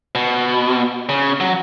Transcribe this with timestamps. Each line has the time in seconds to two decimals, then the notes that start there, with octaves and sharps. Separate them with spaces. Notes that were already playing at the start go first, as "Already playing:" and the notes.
0.15 B2
1.09 C#3
1.40 F#3